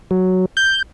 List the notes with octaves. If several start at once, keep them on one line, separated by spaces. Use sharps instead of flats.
F#3
G6